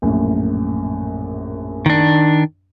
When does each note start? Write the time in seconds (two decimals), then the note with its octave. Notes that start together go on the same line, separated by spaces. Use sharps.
0.02 A#1 F#2 A2
1.86 D#3 D4